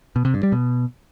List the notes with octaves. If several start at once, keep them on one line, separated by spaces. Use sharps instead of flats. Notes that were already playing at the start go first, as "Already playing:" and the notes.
B2
C3
G2
G3
B2